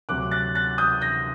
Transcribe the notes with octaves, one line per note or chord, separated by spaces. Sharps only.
D2 C3 F#3 D6 F#6
F#6 A6
F#6 A6
D#6 G6
G6 A#6